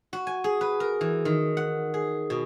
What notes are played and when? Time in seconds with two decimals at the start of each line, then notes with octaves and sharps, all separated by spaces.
0.13 F#4
0.27 G#5
0.44 G#4
0.61 B4
0.80 A#4
1.01 E3
1.25 D#3
1.57 F#5
1.94 G#4
2.30 B2